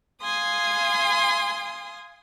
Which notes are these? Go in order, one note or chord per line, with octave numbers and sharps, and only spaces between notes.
F5 G#5 C6 D#6